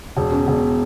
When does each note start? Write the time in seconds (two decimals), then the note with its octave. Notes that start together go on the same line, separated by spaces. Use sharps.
0.17 E1
0.32 C#3
0.48 E1